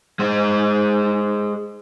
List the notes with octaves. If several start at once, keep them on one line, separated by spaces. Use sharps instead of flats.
G#3 C5